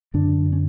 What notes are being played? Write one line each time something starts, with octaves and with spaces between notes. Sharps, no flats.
F#2 D3 D4
C#4